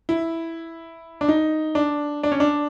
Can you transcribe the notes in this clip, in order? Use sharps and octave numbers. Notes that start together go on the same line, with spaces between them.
E4
D4
D#4
D4
D4
C#4
D4